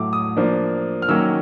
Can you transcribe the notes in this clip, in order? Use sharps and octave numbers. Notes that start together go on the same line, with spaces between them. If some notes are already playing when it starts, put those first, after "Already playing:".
Already playing: A2 F#3 A3 D6
D#6
F3 A#3 D4
F6
D#3 F#3 A#3 C#4 E6